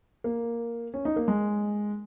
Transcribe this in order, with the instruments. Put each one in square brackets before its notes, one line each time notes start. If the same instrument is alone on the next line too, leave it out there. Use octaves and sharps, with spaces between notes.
[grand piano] A#3
C#4
D#4
A#3
G#3